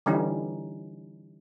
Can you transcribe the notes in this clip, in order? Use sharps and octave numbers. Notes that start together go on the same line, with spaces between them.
D3 E3 G3 C#4 D#4